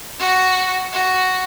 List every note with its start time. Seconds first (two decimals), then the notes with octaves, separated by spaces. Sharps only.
0.19 F#4
0.92 F#4